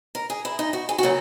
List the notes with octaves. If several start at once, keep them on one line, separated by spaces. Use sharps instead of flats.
A#4
G#4
E4
D#4
F#4
G#4
F#4
C#3 F#3 A#3